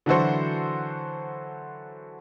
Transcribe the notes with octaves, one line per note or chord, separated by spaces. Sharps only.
D3 E3 F#3 F#4 A4 C5